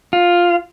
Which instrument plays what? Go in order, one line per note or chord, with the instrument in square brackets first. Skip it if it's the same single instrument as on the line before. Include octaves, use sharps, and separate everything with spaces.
[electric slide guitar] F4